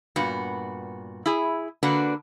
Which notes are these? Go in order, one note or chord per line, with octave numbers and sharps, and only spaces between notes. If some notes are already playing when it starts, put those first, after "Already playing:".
G2 A#2 B3 F#4
E4 G#4
D3 A#3 D4 F#4 B4